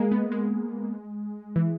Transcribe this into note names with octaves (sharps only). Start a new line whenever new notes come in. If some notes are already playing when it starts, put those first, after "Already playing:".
Already playing: G#3 A#3
B3
G#3
E3